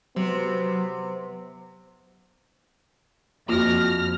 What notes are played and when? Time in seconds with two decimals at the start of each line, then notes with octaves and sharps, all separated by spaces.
0.16 C3 F#3 B3
3.49 F2 A#3 F4 F#4 F6 A#6